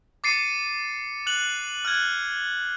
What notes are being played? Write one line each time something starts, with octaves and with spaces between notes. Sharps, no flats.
D6 A6 C7 C#7 D#7
F#6 F7 F#7
F6 F#6 G#6